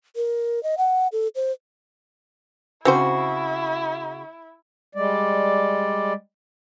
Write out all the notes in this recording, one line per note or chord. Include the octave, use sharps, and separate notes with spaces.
A#4
D#5
F#5
A4
C5
C#3 C4 E4 F#4 C5
G3 G#3 D5